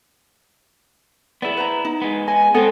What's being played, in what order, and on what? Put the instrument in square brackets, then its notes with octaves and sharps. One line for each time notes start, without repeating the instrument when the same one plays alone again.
[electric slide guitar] B3 E4 [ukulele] G#4 D5
[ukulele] B4 C5 A#5
D#4
[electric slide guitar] G#3 B3
[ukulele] D#5 [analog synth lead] G#5
[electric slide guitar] G#3 C4 [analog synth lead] B3 [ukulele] A4 C5